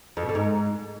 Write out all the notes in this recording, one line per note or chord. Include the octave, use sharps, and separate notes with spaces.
F2
B2
D3
G#2